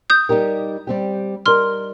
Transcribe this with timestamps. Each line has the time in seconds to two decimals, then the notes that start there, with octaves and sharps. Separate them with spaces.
0.10 D#6 G6
0.29 G3 D#4 G4 A#4
0.87 G3 C4 G4
1.46 G3 D#4 A#4 C6 F6